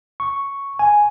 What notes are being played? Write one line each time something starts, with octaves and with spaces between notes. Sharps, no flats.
C#6
G#5